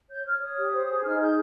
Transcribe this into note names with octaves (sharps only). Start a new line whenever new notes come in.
C#5 G6
C#5 F6
C#5 D#6
G4
C5
G#4
D#4 F6
G#4 G6